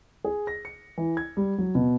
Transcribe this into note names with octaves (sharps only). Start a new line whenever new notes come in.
G#4
A#6
C#7
E3
G#6
G3
F#3
B2